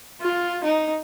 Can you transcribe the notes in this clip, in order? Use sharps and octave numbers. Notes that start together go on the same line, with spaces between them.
F4
D#4